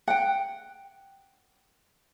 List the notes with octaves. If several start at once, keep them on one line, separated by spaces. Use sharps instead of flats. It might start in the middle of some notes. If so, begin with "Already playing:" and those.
F#5 G5